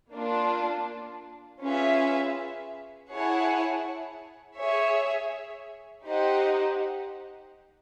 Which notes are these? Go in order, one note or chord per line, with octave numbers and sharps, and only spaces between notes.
A#3 D4 F4
C#4 F4 G#4 B4 E5
E4 G#4 C#5 F#5 A5
G#4 C#5 E5
D#4 G4 C5 D#5 F#5